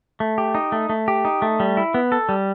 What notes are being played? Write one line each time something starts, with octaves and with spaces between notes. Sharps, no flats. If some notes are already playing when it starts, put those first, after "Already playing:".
A3
G4
D#4
A3
A3
G4
D#4
A3
G3
E4
B3
A4
G3